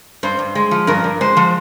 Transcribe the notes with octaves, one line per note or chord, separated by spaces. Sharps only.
G2 C5
G2
G#3
F3
G2 A#4
G2
G#3 C5
F3